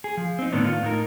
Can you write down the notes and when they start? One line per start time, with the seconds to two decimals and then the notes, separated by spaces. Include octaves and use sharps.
0.04 G#4
0.17 F3
0.39 C4 D#4
0.52 A2 D3 D#3 B3 D4
0.65 F4
0.83 A2 D#4 A#4